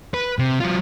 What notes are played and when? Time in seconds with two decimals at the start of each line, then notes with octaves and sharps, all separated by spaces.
0.14 B4
0.39 C3
0.60 F#3 F4